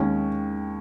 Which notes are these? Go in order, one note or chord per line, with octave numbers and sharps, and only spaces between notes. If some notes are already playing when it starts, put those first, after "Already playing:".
Already playing: D#2 D#3 G#3 C#4